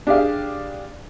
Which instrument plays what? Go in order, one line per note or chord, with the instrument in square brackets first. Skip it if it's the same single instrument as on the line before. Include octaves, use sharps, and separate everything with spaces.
[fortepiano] D4 G4 G#4 F5